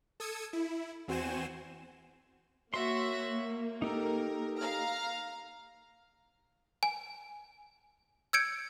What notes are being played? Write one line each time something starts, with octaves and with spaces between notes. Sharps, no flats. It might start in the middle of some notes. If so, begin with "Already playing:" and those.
A4 D#6 E6 G#6 C#7
E4
E2 C4 F#4 C5 G#5 E7
A#3 F#4 C#5 E5 C6
D#4 G4 A4 A#4
F5 A#5 F6
G#5
E6 G6 G#6 C#7 D7